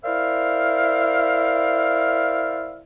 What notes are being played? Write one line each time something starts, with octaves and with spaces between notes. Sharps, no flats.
E4 A#4 C5 D5 E5 F5